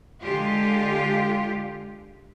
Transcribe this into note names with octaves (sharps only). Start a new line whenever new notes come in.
D3 G#3 F4 G4